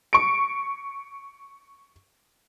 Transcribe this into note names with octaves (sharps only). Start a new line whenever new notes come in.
C#6 D7